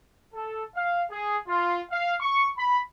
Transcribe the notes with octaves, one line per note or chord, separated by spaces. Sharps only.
A4
F5
G#4
F4
F5
C#6
B5